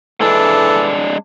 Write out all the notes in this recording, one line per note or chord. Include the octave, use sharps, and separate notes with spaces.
E3 G#3 D4 A4